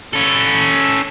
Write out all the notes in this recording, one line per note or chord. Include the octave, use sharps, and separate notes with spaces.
C#4 A4